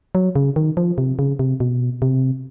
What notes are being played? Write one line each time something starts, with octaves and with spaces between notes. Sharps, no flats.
F#3
C#3
D#3
F3
C3
C#3
C3
B2
C3